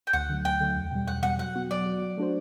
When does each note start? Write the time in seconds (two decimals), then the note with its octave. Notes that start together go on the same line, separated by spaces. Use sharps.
0.07 G5
0.13 D2 F#5
0.29 D3 F#3 A3
0.45 D2 G5
0.61 D3 F#3 A3
0.76 E2
0.92 B2 G3
1.08 E2 F#5
1.23 B2 G3 F#5
1.39 F#3 F#5
1.55 B3 F#4
1.71 F#3 D5
1.86 B3 F#4
2.02 F#3
2.17 A3 D4 F#4 C5